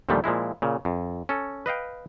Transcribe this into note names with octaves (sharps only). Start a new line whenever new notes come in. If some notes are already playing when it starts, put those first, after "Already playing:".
D#2 A#2 D3 F3 G3 A3
A#2 F3 G#3 E4
A#2 C#3
F2
C#4 A4
B4 D#5 F5 G5